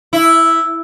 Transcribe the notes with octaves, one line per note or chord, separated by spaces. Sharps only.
E4